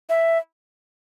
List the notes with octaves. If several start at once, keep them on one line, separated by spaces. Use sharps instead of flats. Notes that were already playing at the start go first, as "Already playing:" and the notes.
E5